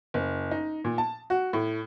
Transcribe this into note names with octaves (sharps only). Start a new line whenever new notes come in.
F#1
D#4
A#2
A5
F#4
A2